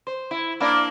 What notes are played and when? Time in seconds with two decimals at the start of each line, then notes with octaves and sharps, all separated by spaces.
0.07 C5
0.31 E4
0.60 A#3 D4 E4